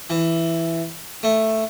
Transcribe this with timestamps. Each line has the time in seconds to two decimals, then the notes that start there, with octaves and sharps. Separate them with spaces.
0.10 E3
1.23 A3